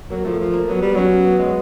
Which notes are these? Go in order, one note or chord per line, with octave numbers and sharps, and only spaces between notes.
F#3 A#3
F3 A3
F3
A#3
F#3 B3
G3 B3
F#3 C#4
B3
G#3
F#3